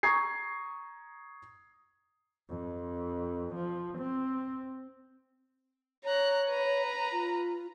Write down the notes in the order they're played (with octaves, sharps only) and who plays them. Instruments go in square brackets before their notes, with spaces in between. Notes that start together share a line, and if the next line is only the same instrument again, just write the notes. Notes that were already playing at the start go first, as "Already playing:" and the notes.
[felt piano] A#5 C#6 D#6 G#6 C7
[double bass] F2
F3
C4
[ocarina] C#5 [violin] A#5 F#6
[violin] B4 A#5
[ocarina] F4